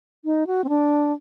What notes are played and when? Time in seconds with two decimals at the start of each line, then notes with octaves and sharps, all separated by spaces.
0.25 D#4
0.47 F#4
0.64 C4
0.69 D4